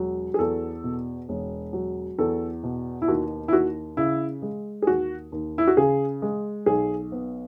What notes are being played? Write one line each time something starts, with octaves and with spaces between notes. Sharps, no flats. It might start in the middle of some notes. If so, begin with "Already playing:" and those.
Already playing: E1 F#3
G#4
E2 A4
B2
E1
F#3
E2 A4
B2
E4
D#2 F#4
E4
D#2 F#4
C#3 E4
G#3
G#4
D#2 F#4
D#2
E4
F#4
C#3 G#4
G#3
B1 G#4
B3